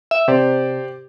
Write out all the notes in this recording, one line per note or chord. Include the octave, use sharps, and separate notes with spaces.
E5
C3 G4 C5 D5